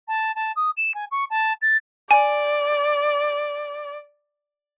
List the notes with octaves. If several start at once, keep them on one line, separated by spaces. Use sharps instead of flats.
A5
A5
D#6
E7
G#5
C#6
A5
A6
D5 G#5